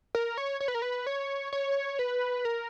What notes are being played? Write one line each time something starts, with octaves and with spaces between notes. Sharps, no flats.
A#4
C#5
C#5
B4
A#4
B4
C#5
C#5
B4
A#4